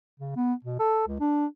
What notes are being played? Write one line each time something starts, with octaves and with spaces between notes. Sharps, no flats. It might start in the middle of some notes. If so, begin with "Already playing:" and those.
C#3
B3
B2
A4
C#2
D4